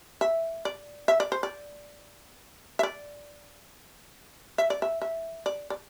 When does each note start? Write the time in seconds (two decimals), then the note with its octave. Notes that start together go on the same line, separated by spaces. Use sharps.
0.21 E5
0.65 D5
1.08 E5
1.20 D5
1.32 C5
1.43 D5
2.79 E5
2.83 D5
4.58 E5
4.70 D5
4.82 E5
5.02 E5
5.46 D5
5.70 D5